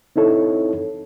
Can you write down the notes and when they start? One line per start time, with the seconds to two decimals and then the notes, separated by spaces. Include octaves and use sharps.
0.16 C4 D#4 E4 A4 C#5